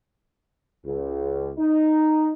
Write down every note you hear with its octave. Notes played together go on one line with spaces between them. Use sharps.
C#2
D#4